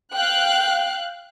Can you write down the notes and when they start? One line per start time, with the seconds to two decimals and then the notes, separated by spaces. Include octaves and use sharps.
0.14 F5 G5 F#6